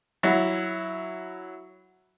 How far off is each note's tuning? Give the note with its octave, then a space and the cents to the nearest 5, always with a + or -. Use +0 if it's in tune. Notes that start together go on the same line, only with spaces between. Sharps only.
F#3 +0 E4 +0